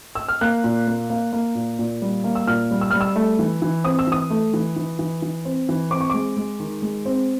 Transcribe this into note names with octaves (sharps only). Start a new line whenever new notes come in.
E6
F6
A#3 F#6
A#2
A#3
A#3
A#3
A#2
A#2
G3
A#3
E6
A#2 F6
G3
E6
G3 F6
E6
A3
E3
E3
C4 D#6
E6
E3 D#6
A3
E3
E3
E3
E3
C4
E3
C4 D6
C#6
G#3 D6
G#3
D#3
G#3
C4